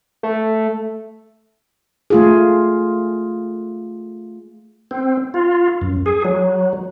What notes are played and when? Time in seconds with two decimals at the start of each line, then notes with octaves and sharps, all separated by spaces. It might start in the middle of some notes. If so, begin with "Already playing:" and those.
0.23 A3
2.10 A3 F4 G#4
4.91 C4
5.34 F4
5.81 F#2
6.06 G#4
6.25 F#3